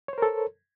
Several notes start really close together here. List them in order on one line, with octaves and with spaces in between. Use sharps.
C#5 C5 A#4 A4